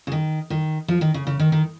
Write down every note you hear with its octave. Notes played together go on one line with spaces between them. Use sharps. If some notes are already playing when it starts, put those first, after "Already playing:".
C#3
D#3
D#3
F3
D#3
C#3
C#3
D#3
D#3